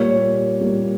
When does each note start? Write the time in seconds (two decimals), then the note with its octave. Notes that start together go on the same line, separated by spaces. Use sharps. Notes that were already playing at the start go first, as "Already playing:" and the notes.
Already playing: A#2 G3 A#3 C#5
0.61 A#2 G3 A#3